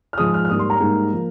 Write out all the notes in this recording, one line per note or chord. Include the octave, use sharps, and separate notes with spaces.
F6
G#2 F3 G#3 D#6
F6
F6
G#2 G3 A#3 D#6
C6
A#5
G#2 G3 A#3
F3 A#3